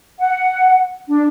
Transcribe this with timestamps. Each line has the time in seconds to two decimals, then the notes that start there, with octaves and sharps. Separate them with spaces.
0.19 F#5
1.08 D4